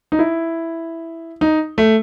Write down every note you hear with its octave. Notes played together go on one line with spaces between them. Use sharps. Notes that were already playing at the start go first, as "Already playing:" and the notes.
D#4
E4
D#4
A3